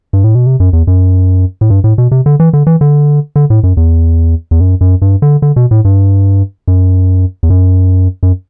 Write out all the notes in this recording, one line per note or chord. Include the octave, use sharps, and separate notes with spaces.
G2
A2
B2
C3
F#2
E2
F#2
A2
G2
A2
B2
C3
D3
E3
D3
E3
D3
D3
A2
F#2
E2
E2
F#2
F#2
G2
D3
D3
B2
A2
G2
F#2
E2
F#2
F#2